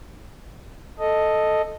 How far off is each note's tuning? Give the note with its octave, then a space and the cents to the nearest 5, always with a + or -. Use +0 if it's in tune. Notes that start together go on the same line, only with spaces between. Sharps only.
A4 +0 D#5 +0